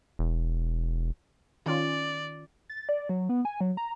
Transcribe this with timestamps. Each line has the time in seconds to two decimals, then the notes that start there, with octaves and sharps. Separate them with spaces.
0.19 E1
1.66 D#3 C#4 F4 D5
2.69 A6
2.89 D5
3.09 F#3
3.29 B3
3.45 G#5
3.61 F#3
3.77 A#5